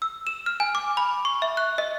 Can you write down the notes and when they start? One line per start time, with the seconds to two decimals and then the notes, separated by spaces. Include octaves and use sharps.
0.02 E6
0.27 E7
0.46 F6
0.60 G#5
0.75 D6
0.97 B5
1.25 C#6
1.42 E5
1.57 F#6
1.78 D#5